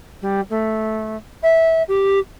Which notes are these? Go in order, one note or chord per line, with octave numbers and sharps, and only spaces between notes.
G3
A3
E5
G4